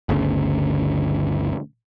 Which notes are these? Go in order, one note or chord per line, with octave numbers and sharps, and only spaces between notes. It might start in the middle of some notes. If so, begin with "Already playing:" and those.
G1 D2 C#3